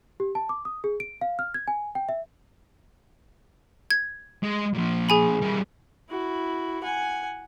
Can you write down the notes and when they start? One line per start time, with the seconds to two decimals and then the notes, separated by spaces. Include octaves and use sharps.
0.20 G4
0.35 A5
0.49 D6
0.65 D#6
0.84 G#4
1.00 D7
1.21 F5
1.39 F6
1.54 G#6
1.68 G#5
1.95 G5
2.09 E5
3.91 G#6
4.43 G#3
4.74 A#2 F3
5.09 G#4 G#5 B5
5.42 G3 A#3
6.09 E4 F#4
6.83 F#5 G#5